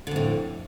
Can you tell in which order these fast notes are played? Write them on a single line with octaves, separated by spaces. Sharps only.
D3 F2 A2